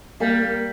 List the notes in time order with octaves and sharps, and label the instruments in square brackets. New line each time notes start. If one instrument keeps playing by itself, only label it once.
[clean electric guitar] G3 [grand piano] A#3
[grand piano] A#3